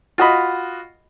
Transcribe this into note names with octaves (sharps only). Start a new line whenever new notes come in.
F4 F#4 D#5 B5